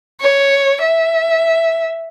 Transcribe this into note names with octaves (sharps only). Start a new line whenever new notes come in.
C#5
E5